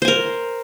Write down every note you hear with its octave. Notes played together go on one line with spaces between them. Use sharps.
A#4 C5 G#5